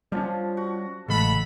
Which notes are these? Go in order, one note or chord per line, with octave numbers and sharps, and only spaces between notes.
F3 G3 A#3 C#4 D4 F4
F#4
A1 C#3 G#3 A4 F5 F#5 B5